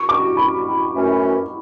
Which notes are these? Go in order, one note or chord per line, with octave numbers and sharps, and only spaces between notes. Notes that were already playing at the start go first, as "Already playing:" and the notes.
Already playing: C#6
D6
B5
F#2 E3 A3 C#4